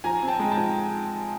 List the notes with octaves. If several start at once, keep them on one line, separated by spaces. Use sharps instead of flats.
F3 G#5 A#5
C4
G5 A5
G#3
G5 A5
F3